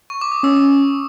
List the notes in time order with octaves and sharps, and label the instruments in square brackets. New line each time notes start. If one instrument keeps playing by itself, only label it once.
[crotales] C#6
D6
D#6
[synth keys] C#4 [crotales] E6